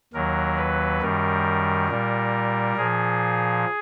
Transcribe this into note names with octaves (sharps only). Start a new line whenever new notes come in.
D#2 D#3 F#3 A#4
B4
F#2 D#3 G3 A#4
A#2 G3
A#2 F3 G#4